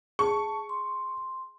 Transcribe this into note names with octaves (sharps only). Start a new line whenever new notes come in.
G#4 A5 C#6
C6